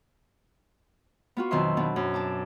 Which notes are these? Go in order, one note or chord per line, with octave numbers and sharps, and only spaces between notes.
B3 F4 F#4
F2 B2 D#3 F#3 E5 C6
B2 B3 D4
F#2
D4 A5 D6